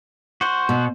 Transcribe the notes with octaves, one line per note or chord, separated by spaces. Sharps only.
F#4 C5
B2